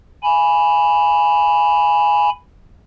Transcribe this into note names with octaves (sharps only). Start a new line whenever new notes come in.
G#5 B5